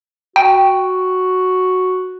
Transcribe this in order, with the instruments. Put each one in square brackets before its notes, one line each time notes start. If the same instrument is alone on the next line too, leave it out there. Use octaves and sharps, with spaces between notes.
[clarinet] F#4 [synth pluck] G5